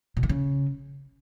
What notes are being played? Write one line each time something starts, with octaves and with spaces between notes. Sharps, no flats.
B2
D#3
C#3